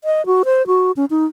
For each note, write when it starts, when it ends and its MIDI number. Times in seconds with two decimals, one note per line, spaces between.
0.04 0.25 75
0.26 0.43 66
0.45 0.66 72
0.67 0.92 66
0.97 1.05 61
1.10 1.26 63